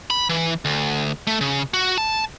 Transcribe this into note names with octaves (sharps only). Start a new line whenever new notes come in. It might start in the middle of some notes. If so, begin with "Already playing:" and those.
B5
E3
D2
A3
C#3
F#4
A5